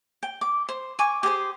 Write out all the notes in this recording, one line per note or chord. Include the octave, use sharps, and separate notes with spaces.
G5
D6
C5
G#5 C#6 D6
G4 G#4 C5 C6